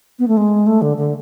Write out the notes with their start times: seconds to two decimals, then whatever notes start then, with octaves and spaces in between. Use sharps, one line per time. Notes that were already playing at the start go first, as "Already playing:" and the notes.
0.19 B3
0.28 A3
0.37 G#3
0.67 A3
0.82 D3
0.97 D3